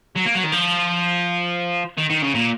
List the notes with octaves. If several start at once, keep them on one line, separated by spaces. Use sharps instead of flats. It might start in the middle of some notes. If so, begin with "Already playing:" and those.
F#3
A#3
F#3
D#3
F3
D#3
D#3
C#3
A#2